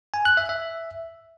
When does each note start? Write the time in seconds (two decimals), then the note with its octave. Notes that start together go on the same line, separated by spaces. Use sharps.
0.14 G#5
0.25 F#6
0.37 E5
0.49 E5